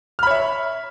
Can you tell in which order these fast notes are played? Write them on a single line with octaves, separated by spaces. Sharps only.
F6 B5 C#5 E5